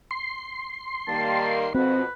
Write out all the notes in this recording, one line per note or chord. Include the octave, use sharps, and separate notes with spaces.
C6
D#3 G3 A#3 A5
F2 B2 C4 F#4 B4